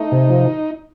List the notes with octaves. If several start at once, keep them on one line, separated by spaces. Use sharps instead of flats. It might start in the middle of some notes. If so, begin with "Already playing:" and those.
Already playing: A3 D#4
C3
F3